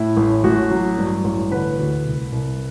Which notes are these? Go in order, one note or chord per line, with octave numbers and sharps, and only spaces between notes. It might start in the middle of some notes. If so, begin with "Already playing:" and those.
Already playing: A2 E4
A1
A1 F#4
F#3
G2
A1
D3 B4
D2
C2
C2